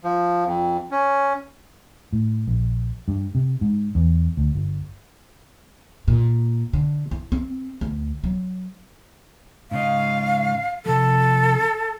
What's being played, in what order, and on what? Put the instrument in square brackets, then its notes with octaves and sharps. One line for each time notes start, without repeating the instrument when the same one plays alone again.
[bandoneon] F3
F2
C#4
[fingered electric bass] A2
A#1
G2
C3
G#2
E2
D2
G1
[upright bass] A#2
D3
E4
C4
D2
F#3
[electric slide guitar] G#2 C#3 D#5 [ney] F5
[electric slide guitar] C3 F3 [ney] A4